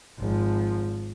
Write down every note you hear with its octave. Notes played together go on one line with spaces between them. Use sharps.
G#1 F3